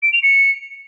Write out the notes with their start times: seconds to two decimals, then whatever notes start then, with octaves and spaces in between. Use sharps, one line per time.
0.03 D7
0.13 F7
0.23 C#7